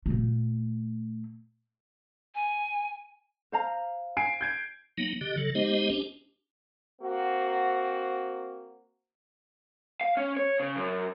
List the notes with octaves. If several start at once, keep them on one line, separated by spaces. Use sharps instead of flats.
A#2 A3
G#5
C5 F5 A#5
G#5 C7 D7
G6 G#6 D7
F#3 A#3 B3 D#4
D3 G4 D#5
C#3 F#3 A4
G#3 B3 D#4 G4 C5 D#5
C#4 D4 G4
A#3 C4 F#4
F5
C#4
C#5
C#3
F#2